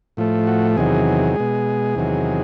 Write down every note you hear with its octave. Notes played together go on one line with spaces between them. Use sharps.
A2 F3 A3
F#4
E2 C3 D#3 F#3 G#4
B2 G#3
E2 C3 D#3 F#3